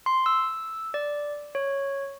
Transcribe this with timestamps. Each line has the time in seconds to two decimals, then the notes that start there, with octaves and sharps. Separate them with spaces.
0.06 C6
0.26 E6
0.94 D5
1.55 C#5